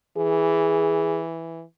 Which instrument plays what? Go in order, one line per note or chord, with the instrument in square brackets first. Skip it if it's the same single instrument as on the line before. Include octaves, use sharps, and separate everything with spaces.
[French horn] E3 [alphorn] G#4